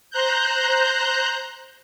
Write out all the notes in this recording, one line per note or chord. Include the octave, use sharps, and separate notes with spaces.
C5 A#5 F#6 G6